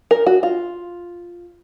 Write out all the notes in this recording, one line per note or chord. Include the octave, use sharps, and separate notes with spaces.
A#4
F#4
F4